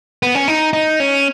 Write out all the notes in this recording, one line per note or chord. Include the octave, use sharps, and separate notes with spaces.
B3
C#4
D#4
D#4
C#4